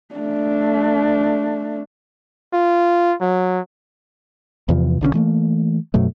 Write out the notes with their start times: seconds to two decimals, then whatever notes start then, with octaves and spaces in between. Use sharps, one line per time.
0.15 A3 D4
2.53 F4
3.21 F#3
4.69 E2 C3 E3 F3
5.01 B1 D3 E3 C#4
5.14 E3 A3 A#3
5.94 F#2 B2 F#3 A3